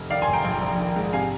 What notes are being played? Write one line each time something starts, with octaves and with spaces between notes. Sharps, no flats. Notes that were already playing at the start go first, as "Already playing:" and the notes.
Already playing: F1
D#3 D5 F5
G#5 C6
F1
G5 A#5
A#1
A#1
D#3
G#2
C3 F5 G#5